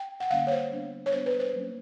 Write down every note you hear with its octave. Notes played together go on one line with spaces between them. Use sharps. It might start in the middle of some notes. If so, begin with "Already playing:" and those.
Already playing: G5
F#5
D3 G3 A#3 C#4 F5
C#5
C5
G3 B3 D4
C#5
G3 B3 D4 C5
B4
C5
F#3 A#3 C#4